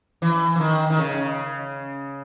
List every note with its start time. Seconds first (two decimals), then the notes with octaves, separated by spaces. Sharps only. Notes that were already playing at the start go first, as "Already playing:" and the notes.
0.22 E3
0.56 E3
0.60 D#3
0.90 D#3
0.99 C#3